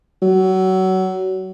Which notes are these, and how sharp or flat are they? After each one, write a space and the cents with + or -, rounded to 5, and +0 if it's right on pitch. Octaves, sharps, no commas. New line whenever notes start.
F#3 +25